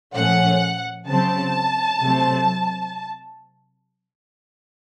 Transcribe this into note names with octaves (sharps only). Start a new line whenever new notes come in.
A#2 F3 A3 C#4 F#5
C#3 F#3 C4 A5
C3 F#3 A3 C4